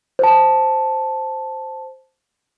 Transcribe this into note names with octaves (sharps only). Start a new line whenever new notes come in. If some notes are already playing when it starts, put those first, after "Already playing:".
C5 A5